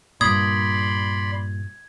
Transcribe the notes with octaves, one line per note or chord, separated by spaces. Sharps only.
G2 A#2 D5 B5 C6 D#6 G#6